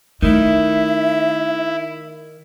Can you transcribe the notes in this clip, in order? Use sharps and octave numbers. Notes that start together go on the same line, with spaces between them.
D#3 A3 E4 E5